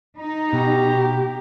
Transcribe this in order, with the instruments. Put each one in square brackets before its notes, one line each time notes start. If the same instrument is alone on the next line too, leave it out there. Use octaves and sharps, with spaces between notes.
[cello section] D#4 [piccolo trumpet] A#5
[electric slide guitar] B2 [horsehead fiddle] G4